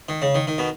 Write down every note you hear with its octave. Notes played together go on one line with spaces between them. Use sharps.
D#3
C#3
D#3
D#3
B2